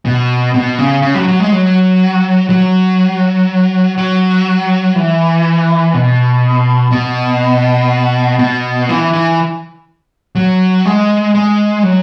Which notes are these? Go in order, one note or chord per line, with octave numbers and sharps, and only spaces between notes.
B2
B2
C#3
C#3
F#3
F#3
G#3
F#3
F#3
F#3
E3
B2
B2
B2
E3
E3
F#3
G#3
G#3
F#3